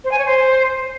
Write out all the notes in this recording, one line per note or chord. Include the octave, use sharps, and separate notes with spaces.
C5
G#5
C#5
C5